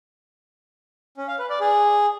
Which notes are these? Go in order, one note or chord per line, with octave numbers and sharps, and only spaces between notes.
C#4
F5
B4
D5
G#4